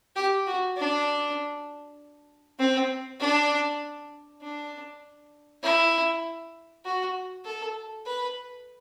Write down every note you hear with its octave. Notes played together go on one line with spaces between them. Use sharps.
G4
F#4
D4
C4
D4
D4
E4
F#4
A4
B4